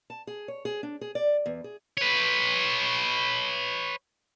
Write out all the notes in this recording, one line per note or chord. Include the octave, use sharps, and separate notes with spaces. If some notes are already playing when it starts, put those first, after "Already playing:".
A5
G#4
C#5
G#4
D4
G#4
D5
E2
G#4
B4 C#5